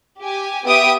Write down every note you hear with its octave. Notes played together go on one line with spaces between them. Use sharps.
G4 G#5
B3 G4 E5 G5 D#6 D7